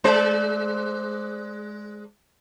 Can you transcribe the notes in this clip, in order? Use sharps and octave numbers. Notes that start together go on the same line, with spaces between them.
G#3 C5 D5